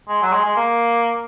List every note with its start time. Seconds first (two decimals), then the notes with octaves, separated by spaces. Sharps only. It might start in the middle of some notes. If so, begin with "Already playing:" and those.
0.08 G#3
0.22 F#3
0.33 G#3
0.44 G#3
0.56 A#3